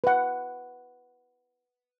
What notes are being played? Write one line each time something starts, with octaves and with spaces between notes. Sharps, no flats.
B4 F#5